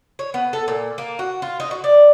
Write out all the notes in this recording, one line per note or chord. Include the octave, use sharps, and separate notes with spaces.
C#5
B3
A4
A#2
A#3
F#4
F4
D#4
F#4
D5